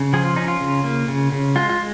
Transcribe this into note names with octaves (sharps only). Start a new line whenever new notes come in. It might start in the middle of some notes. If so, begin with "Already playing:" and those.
Already playing: C#3
F3 G#4
F4
C#4 D#4
F4
C#3
A#3
C#3
C#3
G#3 F4
F4